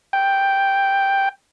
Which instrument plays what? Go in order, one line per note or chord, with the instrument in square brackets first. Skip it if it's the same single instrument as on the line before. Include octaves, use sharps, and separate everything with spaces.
[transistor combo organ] G5